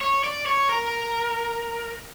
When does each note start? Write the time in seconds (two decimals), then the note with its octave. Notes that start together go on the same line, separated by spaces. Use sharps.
0.01 C#5
0.24 D5
0.46 C#5
0.69 A#4